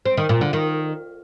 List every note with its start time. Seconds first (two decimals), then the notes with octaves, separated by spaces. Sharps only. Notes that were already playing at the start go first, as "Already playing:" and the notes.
0.06 C4
0.17 D#3
0.29 A#2
0.41 D3
0.53 D#3